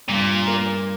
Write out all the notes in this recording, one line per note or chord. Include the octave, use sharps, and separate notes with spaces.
G2 A#2
A#3